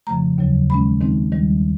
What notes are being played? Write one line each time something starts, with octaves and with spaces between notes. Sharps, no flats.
F2 C#3 F3 A3 A#5
D#2 C#3 F#3
D#3 G#3 C#4 B5
D#3 G#3 C4 D#4
D#2 D#3 G3